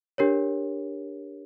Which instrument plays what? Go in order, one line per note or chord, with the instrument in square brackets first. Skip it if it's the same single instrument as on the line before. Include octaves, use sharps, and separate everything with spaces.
[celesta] D4 G4 A#4 C#5